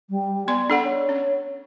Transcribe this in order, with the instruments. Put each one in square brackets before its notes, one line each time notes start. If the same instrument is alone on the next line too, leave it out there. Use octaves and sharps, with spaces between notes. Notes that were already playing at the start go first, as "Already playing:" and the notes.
[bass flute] G3
[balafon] B3 C6 [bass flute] D5
[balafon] D4 A4 F#5
[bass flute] C#5
[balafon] C#4